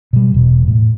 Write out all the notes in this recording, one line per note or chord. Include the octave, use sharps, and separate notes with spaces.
B2 G3
E1 B2
A2